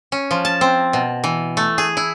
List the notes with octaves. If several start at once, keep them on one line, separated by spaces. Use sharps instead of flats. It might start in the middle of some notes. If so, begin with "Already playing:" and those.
C#4
F3
A5
C4
B2
E3
A3
G#4
E4